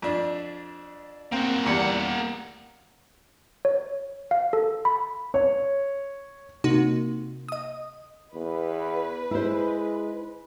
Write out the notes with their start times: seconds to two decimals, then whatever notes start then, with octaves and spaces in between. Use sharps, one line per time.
0.02 F2 D4
1.32 A#3 C4 F#4
1.66 E2 G3 A#3 F#5
3.65 C#5
4.31 F5
4.53 A4
4.85 B5
5.34 C#5
6.64 C3 A#3 D#4 F#4
7.49 D#5 D#6
8.35 E2 B4
9.31 G#3 E4 C5